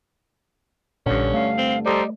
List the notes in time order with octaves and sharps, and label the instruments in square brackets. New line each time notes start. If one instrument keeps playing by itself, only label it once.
[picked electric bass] A#1 A#2 [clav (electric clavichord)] G2 D3 [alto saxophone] C#4
[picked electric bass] A3 [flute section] F5
[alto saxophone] C4
[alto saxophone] G3 [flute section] A4 C5 A#5 [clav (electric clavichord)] D5 D#5